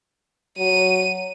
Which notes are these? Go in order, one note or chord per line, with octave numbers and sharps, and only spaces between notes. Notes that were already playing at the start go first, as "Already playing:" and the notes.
F#3 D#7